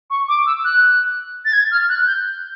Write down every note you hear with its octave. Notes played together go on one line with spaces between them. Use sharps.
C#6
D6
E6
F#6
A6
G#6
F6
F#6
G6